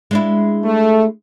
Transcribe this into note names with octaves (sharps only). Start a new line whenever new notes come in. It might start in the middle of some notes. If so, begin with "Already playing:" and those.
G#3 D4 E4
A3